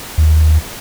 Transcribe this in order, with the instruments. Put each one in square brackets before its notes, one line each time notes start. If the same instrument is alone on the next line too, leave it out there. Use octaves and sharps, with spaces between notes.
[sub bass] D#2